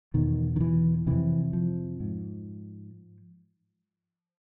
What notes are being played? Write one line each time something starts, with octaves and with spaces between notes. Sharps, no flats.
E2 B2 D#3
D#3
E3
F2 C3 E3
F3
G#2